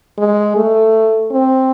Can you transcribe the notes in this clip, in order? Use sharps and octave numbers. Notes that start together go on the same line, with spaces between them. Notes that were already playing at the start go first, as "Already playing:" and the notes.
G#3
A3
C4